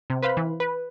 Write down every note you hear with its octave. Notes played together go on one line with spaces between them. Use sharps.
C3
B4 C5 F5 B5
E3
B4